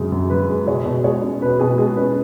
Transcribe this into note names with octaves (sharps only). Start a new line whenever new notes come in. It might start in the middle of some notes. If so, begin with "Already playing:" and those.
Already playing: F#2 C#3 G#3 G#4
F#2
C#3 B4
G#3
B2 G#4 C#5
B2
G#3 G#4 C#5
C#4
B2 B4
B2 G#4
G#3 G#4
C#4 B4